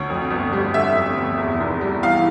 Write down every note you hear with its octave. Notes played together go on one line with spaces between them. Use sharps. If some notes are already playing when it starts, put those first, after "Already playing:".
Already playing: D2 C#5
F2
G1
G3
D3 E5
F2
G1
E2
F1
G3
E3 F5